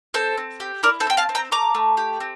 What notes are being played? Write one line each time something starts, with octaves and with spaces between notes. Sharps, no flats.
C4 A4 C5
C4
G4
E4 A#4 D5
A4 C5
C4 G5
F5 A5
C4
G5 A#5
A3 A#5 D6
A3
G4
C4